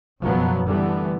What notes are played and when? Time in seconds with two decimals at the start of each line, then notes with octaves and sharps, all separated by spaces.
0.21 F#1 F#2 B2 F3 F#3 B3
0.66 D3 E3 G3 A3 B3